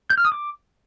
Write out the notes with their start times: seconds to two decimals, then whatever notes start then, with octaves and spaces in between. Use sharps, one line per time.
0.10 G6
0.17 F6
0.25 D#6
0.32 D6